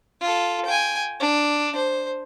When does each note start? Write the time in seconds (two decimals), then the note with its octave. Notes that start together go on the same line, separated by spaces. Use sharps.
0.21 F4 A4
0.65 G5 G#5
1.20 D4
1.76 C5